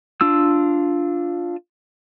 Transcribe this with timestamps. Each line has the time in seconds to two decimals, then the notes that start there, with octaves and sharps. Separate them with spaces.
0.21 D4 F4 E6